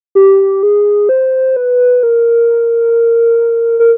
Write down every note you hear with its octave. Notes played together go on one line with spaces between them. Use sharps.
G4
G#4
C5
B4
A#4
A#4